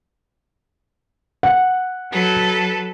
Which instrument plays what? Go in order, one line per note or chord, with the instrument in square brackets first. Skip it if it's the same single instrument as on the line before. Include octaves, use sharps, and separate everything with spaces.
[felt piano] F#5
[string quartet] F#3 A4 B4